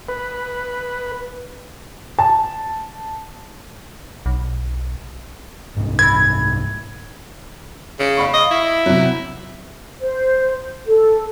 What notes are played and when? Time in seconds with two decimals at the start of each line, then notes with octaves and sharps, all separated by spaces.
0.09 B4
2.19 A5
4.26 B1
5.77 C2 G#2
5.99 E3 E4 G#6
7.99 C#3
8.17 F5 B5 C#6
8.34 D#5
8.51 E4
8.86 C3 F#3
10.00 C5
10.87 A4